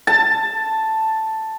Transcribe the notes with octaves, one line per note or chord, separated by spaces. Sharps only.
A5